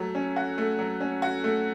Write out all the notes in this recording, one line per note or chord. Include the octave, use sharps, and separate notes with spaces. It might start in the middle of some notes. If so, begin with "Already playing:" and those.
Already playing: F#3 A3
C#4
F#4
A3
F#3
C#4
F#4
A3